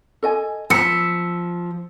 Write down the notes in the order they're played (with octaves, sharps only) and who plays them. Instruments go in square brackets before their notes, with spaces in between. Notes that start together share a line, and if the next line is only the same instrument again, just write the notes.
[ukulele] A4 D#5 G#5
[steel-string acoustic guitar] F3 [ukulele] A#5 B5 [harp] E6 B6 C#7